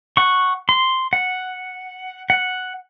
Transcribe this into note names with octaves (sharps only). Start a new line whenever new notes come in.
F#5 C#6
C6
F#5
F#5